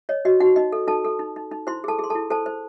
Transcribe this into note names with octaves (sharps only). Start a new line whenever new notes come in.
C#5 D#5
F#4 D#5
D#4 F#4 F#5
D#4 D#5
A4
D#4 A4 A5
A4
D#4
D#4
D#4
E4 C5 C6
G#4 A4 A5
G#4 C6
E4 A4 A5
A4 C5 A5
C5